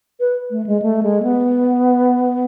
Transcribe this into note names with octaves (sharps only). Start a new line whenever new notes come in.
B4
A3
G#3
A3
G#3
B3